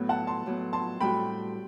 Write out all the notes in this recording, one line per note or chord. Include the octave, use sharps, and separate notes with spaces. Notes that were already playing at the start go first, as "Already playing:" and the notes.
Already playing: A2 F#3 B3
F#5 A5
A5 C6
A2 F#3 B3
A5 C6
A2 G3 C4 F#4 G5 B5